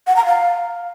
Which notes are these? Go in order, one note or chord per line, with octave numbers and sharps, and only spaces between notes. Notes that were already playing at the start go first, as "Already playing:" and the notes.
F#5
A#5
F5